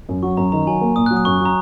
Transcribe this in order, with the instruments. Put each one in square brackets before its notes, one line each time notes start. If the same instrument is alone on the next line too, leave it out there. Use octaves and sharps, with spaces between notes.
[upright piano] F#2
[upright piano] F#3 [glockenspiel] C#6
[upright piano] F#2 [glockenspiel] A#5
[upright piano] D#3 [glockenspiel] A#5
[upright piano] F#3 [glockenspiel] G#5
[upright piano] A#3
[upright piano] A#2 [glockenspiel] D#6
[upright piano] F#3 [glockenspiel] F#6
[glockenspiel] D#6
[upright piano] F#2 [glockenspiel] C#6
[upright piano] F#3 [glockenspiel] A#5